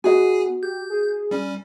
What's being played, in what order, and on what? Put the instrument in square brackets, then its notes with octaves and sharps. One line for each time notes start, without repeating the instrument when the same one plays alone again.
[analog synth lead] B3 [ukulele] F#4 D#5 [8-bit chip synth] G#4 G#5
[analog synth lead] G4 [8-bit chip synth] G6
[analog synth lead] G#4
[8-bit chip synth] G3 C#4